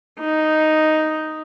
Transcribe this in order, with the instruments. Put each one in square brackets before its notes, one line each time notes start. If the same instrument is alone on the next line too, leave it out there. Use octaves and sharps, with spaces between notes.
[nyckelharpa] D#4